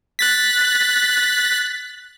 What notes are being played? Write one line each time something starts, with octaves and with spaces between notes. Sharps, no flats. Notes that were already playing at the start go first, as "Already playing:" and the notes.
F#6 A6 B6